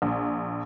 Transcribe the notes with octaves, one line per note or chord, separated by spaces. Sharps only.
A#1